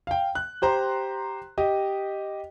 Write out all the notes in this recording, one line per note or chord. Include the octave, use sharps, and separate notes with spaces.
F5 G5
F#6
G4 C5 A#5 C6
G4 D#5